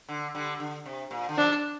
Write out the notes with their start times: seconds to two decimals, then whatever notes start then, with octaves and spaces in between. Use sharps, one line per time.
0.09 D3
0.35 D3 G3
0.60 D3
0.86 C3
1.11 A#2
1.29 D3
1.37 C3 F3 D4